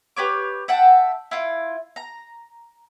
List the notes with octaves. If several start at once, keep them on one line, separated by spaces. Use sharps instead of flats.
G4 B4 C#5 D6
E5 F#5 G5 A5
E4 F4
A#5